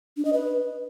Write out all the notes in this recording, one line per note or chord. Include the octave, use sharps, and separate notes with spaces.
D4
D#5
B4